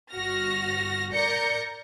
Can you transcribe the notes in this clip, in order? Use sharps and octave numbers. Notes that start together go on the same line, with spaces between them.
G1 F#4 F6 A#6
A#4 D5 G6 A#6 C#7